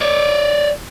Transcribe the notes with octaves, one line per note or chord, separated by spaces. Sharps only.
C#5 D5